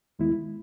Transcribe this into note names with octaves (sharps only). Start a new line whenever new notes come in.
D#2 D#3 G#3 B3 E4